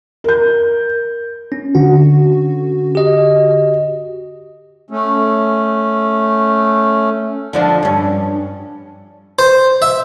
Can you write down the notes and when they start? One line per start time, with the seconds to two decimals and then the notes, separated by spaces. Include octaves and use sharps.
0.24 A#4 G6
1.52 C#4
1.75 D3 F#4
2.95 G4 D#5
4.90 A3 C#4
7.53 D3 F3 D4
7.83 G2 C#4
9.39 C5
9.82 E5